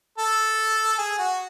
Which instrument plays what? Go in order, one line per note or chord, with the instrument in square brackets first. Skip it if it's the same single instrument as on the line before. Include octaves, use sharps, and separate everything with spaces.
[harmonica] A4
G#4
F#4